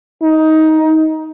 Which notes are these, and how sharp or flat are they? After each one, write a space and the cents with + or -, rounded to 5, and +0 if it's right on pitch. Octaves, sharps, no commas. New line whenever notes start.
D#4 +15